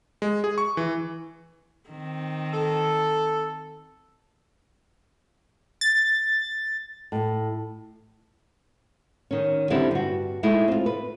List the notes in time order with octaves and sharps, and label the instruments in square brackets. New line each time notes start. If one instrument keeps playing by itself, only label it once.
[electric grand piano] G#3
G#4
C#6
E3
[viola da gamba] D#3 C4
[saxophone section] A4
[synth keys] A6
[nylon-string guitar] A2
D#3 C#4
D3 G3 C4 D4 E4
G2 F#4
G#3 A3 D#4 E4
C4 F4
B4